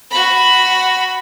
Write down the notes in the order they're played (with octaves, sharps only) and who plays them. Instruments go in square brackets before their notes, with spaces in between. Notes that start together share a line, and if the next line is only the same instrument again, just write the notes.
[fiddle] F#4 B5